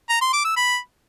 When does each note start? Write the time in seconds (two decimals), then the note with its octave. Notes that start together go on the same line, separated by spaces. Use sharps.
0.09 A#5
0.21 C6
0.33 D6
0.45 E6
0.56 B5